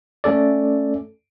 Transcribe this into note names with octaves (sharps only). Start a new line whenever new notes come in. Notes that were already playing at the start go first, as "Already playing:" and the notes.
A3 C#4 A4 D5